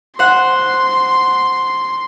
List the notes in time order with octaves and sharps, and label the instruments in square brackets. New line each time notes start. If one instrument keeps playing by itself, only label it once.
[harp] C5 F#5 [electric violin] C6